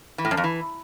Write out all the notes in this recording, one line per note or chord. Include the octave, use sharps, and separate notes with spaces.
E3
A2
F#2
F2
E3